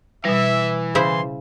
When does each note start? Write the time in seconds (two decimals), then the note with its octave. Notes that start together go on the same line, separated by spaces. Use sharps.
0.25 B2 E3 G3 E5
0.95 C#3 E4 C5 C6